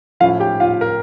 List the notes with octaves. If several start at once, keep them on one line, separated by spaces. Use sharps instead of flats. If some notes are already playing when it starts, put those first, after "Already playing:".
A2 F3 C#4 E4 F4 F5
G4 G5
F4 F5
A#4